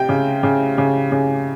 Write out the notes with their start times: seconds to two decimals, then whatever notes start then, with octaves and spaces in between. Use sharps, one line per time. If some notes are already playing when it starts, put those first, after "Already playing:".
Already playing: C3 G5
0.09 C#3
0.43 C#3
0.78 C#3
1.12 C#3